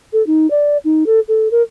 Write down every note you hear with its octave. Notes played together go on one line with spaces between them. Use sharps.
A4
D#4
D5
D#4
A4
A4
A#4